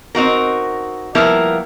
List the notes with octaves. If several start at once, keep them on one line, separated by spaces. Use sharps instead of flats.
C4 D#4 F#4 A#4
F3 G3 A#3 B3 E4 A#4